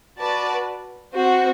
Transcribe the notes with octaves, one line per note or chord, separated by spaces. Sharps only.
F#4 B4 D5 A5
C4 F#4 C5